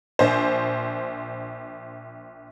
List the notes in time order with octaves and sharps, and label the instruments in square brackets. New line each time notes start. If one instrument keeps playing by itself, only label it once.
[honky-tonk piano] A#1 C5